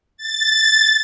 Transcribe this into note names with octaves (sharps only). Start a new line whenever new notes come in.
A6